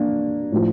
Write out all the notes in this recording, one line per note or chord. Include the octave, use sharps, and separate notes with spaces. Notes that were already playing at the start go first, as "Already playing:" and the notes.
Already playing: A#3 D4
A2 F3